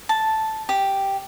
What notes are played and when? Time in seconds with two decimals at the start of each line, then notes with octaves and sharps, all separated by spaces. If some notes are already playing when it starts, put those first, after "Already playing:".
0.09 A5
0.69 G4